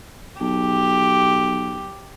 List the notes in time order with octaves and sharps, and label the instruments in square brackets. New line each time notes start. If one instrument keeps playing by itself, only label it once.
[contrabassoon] B1 [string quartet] G4